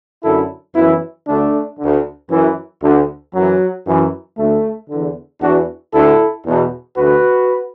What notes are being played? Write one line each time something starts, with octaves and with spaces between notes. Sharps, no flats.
F#2 D3 E4 A4
F#2 E3 B3 E4
D2 D3 A3 D4
D2 D3
F#2 E3
D2 D3
F#2 E3 F#3
F#2 E3
D2 D3 A3
E2 D3
E2 E3 D4 F#4
D2 D3 E4 A4
E2 B2
D2 D3 F#4 B4